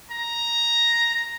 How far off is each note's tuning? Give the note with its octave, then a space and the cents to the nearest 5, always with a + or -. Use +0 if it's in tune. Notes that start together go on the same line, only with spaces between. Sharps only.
A#5 +5